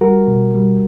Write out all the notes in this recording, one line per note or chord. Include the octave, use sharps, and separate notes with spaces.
G3 F#4 A#4
B2
G3